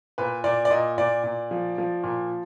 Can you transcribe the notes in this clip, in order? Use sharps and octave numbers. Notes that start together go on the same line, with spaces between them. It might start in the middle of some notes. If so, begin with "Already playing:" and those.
A#2 B4
A#2 D5
D5
A#2 D#5
A#2 D5
A#2
F3
F3
A#2